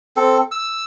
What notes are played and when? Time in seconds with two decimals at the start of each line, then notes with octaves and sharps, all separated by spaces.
0.17 C4 A4
0.51 E6